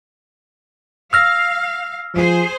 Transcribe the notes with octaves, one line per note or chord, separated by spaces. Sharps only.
F5 E6 F6 A#6
F3 G#4 C5